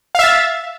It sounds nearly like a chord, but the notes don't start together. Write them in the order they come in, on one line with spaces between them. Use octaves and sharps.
F5 E5 A6